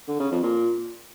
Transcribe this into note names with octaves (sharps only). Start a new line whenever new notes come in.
D3
C#3
F2
A#2